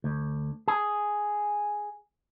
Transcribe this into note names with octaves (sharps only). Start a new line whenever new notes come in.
D2
G#4